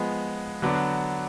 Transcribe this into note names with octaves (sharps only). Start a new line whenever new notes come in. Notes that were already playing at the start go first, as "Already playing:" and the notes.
Already playing: F3 G#3 B3
D3 F#3 B3 D4 F#4